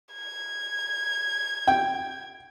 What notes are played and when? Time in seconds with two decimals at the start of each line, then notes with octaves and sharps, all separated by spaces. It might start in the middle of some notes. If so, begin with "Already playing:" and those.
0.14 G#6
1.67 G5